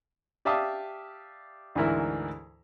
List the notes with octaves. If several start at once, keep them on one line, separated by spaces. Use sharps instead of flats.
G4 D5 E5 F5 A5 D#6
D2 G#2 E3 E4 A#4 E5